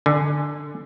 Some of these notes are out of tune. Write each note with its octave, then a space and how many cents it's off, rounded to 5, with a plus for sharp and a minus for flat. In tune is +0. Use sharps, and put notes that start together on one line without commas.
D3 +10 G#5 +0